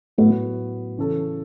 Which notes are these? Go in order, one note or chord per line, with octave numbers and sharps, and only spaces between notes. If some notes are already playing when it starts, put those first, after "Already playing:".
A2 F#3 A3 B3 F#4 B4
C#3 E3 C#4 A4